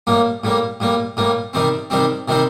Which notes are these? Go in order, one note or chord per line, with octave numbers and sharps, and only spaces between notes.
A2 G3 A#3
A2 G3 A#3
A2 G3 A#3
A2 G3 A#3
C3 D#3 G3 C4
C3 D#3 G3 C4
C3 D#3 G3 C4